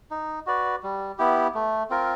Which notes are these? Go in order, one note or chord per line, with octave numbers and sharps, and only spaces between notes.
D#4
F#4 B4 D5
G3
B3 E4 G4
A3
C4 F4 A#4